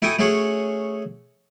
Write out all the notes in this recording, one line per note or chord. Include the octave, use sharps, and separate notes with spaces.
E4 F#4 A4 G5 G#5 D#6
A3 C#4 F#4 G#4 C#5 F#5